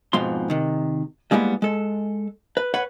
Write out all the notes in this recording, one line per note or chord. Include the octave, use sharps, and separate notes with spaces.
F2 G#2 B2 F3 C6
C3 D#3
G3 G#3 A#3 B3 E4
G#3 A4
B4
B4 C#5 F#5